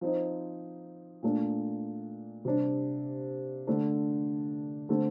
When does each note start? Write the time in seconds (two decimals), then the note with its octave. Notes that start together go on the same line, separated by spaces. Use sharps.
0.01 F3 C4 D#4
1.23 A#2 A3 D4
2.45 C3 G3 D4
3.67 D3 A3 D4
4.89 D3 A3 C4